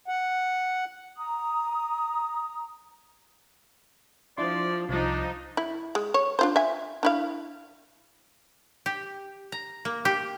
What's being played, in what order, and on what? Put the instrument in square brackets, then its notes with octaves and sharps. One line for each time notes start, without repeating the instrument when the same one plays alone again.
[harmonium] F#5
[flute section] A#5 D#6
[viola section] F3 [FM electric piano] D4 E4 C6 [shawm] D5
[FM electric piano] C2 A5 [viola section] F3 D#4 [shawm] D4
[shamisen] E4
G#3
C#5
D4 F4 C5
E5 G#5
D4 E4 F5
[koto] G4
A#5
A#3
G4